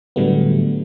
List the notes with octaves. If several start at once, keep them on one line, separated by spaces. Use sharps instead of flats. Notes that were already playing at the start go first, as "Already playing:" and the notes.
A2 D3 F#3 G3 A3 B3